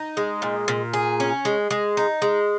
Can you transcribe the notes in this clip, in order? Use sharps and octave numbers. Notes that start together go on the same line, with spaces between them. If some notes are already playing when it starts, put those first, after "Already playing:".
Already playing: D#4
G#3
A#2
A#2
G#4
C#4
G#3
G#3
D#4
G#3